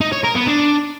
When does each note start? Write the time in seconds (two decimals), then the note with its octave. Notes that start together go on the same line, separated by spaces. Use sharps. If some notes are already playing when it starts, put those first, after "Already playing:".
0.01 D#4
0.12 C#5
0.24 A#4
0.36 B3
0.48 D4